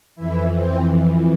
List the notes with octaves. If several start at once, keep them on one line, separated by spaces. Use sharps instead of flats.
F2 E3 E4
C4